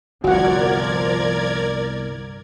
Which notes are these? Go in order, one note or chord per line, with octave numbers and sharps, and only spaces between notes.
G1 C2 F3 F#4 A#4 D5 F#5 G#6